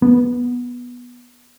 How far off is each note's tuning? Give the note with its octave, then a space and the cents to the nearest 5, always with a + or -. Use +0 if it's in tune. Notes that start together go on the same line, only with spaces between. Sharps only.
B3 -10